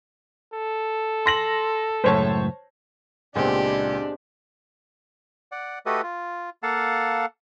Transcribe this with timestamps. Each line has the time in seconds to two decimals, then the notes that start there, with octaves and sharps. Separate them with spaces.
0.54 A4
1.26 C6 A#6 F#7
2.04 C#2 F#2 A2 C5 C#5 A5
3.35 C#2 A#2 G#3 B3 C4 D4 G4
5.52 D5 F#5
5.86 A3 F#4 G4 A4 B4 D#5
6.03 F4
6.63 A#3 A4 F5 F#5 A5